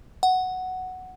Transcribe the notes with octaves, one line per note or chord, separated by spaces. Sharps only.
F#5